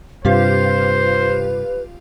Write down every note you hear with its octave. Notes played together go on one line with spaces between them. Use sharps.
G2 C3 F4 G4 B4 C5 F5